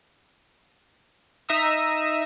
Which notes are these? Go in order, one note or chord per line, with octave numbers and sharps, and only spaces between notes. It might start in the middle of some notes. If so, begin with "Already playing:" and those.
D#4 E5 A#5 D#6 E6